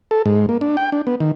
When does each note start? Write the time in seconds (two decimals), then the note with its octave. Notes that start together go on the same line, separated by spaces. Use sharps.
0.11 A4
0.26 G#2
0.49 A#3
0.61 D4
0.77 G5
0.92 D4
1.07 B3
1.20 D#3